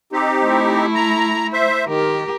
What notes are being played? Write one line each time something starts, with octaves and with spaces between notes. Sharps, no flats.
C4 D#4 G4
A3 E4
A#5
C5 E5
D#3 G4 A#4